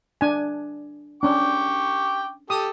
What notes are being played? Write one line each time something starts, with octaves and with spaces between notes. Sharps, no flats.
D4 G#5
C#4 D4 G5 C#6 D6
G4 A4 D#6